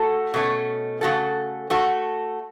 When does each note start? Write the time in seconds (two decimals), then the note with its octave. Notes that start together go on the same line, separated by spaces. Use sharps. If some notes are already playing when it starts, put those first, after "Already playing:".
Already playing: A3 F#4 A4
0.34 B2 A3 C#4
1.01 C#3 A3 F#4 A4
1.70 A3 F#4 A4